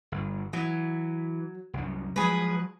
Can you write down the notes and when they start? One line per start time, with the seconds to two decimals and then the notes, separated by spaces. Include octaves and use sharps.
0.12 G1
0.53 E3 F#3
1.73 C2 F#2
2.16 F3 F#3 G#3 G#4 B4